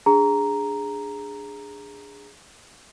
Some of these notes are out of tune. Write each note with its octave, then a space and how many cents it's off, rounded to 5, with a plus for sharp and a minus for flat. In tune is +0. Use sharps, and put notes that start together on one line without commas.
D4 +0 G#4 -10 A#5 +0